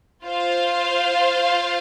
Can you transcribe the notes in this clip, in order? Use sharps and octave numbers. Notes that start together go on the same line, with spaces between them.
F4 C5 F5